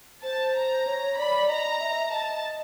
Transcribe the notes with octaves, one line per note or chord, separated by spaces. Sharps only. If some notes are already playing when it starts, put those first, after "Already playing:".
C5 A5
A#5
C#5
D5 B5
D#5 A#5
E5
D#5 A5